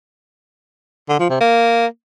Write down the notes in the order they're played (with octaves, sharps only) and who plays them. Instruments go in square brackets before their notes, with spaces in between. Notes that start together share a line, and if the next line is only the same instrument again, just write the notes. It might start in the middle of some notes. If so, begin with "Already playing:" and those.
[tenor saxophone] D3
F3
C3
A#3